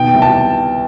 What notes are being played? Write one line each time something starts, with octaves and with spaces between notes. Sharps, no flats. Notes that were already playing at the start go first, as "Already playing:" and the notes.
Already playing: B2 D#3 G5
C2
A5